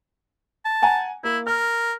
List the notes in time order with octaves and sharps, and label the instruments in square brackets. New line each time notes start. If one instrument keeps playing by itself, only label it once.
[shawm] A5
[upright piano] F#5 G#5 A#5
[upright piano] A#3 [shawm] E4
[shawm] A#4 [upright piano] F6